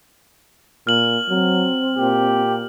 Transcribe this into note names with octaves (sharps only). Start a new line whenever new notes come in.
A#2 F6 F#7
F#3 C4
A#2 G4